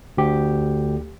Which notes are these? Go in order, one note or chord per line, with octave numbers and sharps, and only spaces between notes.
D2 G4